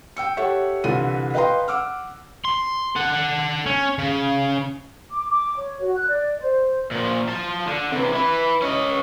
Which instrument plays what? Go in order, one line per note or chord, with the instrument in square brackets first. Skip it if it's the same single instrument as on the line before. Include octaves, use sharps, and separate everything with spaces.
[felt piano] G5 E6 C#7
G4 A4 C#5 E5 F#5
C2 D3 E3 F4 A4 D#7
B4 D#5 F5 G5 A#5 C6
F#5 D6 E6 F6
[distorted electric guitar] C6
A4 F#5
C#4
C#3
[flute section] D6
D6
C#5
F#4
F#6
D5
C5
[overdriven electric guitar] A#2 F3
F4 A5
D3
C3 E3
E4 B4
C#4 D#5